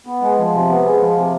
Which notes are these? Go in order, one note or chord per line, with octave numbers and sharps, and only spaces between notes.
B3
G#3
F3
C3
B3
G#3
F3
C3